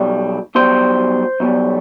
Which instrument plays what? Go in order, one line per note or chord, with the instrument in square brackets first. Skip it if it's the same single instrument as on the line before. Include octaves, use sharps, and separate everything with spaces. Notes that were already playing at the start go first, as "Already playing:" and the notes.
Already playing: [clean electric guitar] B1 B2 G3
B1 B2 G3 C5
B1 B2 G3